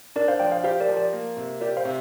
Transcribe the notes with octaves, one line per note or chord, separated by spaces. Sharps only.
D4 A#4 D5
C5 F5
F3 D5 G5
C5 F5
G4 C5 F5
A#4 D5
F3
A#4 D5
A#3
C3
G4 A#4 D5
C5 F5
C3